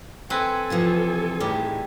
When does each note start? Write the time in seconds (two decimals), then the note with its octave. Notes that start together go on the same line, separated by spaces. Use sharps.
0.30 C4 A4 B4 G#5
0.70 C3 E3 F3
1.40 A2 D#3 G3 G#3